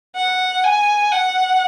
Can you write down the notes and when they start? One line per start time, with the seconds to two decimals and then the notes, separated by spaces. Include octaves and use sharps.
0.15 F#5
0.64 G#5
1.12 F#5